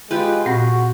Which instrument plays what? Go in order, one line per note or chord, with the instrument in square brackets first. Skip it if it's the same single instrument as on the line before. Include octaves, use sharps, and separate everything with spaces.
[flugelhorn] G#3 [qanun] F4 G4 B4
[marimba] A#2 C4 A#6 [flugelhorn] F#4